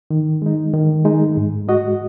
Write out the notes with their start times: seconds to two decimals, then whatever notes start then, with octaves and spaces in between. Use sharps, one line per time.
0.11 D#3
0.42 G#3 D#4
0.74 D#3
1.05 G#3 D#4
1.37 G#2
1.68 G#3 F#4 D#5